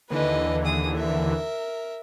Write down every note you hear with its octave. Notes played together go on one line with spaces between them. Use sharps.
D#2 D3 E3 B4 D#5
G#4 D#6
A#4 E5